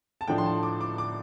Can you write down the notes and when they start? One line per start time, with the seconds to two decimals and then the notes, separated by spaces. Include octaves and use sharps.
0.21 A5
0.28 A2 F3 D4 G5
0.38 C6
0.46 A5
0.63 D6
0.81 D6
0.98 D6